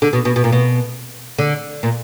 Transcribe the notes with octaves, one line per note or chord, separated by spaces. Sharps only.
D3
B2
B2
B2
A#2
B2
D3
A#2